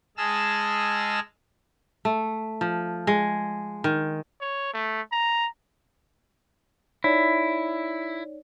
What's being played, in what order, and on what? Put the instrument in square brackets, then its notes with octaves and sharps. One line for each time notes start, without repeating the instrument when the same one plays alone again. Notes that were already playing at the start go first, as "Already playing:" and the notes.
[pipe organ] G#3 G#4 D#5 A5 E6 F6
[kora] A3
F3
G#3
D#3
[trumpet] C#5
A3
A#5
[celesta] D#4 C#5 D5 [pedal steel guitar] E4